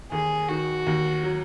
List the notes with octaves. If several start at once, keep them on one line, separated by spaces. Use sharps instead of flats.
D#2 G#4
D#3 F#4
D#2
F#3